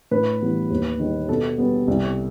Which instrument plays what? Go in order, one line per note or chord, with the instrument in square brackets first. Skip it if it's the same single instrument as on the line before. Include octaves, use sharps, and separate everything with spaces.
[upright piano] A2 B4
E3 G3 B3
D#2
D#3 G3
B2 A4
G3 B3
C2